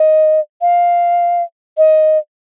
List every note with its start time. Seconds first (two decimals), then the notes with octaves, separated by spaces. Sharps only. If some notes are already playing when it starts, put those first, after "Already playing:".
Already playing: D#5
0.61 F5
1.78 D#5